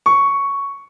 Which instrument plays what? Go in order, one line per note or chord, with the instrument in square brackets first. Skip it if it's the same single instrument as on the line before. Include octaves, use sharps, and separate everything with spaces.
[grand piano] C#6